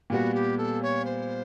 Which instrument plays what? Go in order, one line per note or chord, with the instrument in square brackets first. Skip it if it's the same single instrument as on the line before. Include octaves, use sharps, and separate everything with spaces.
[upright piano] A#2 G3 B3 [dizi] F#4
[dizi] G4
A4
C#5
C5